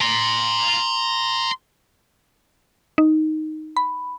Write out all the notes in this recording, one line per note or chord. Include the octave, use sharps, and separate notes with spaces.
A#5 C6
D#4
B5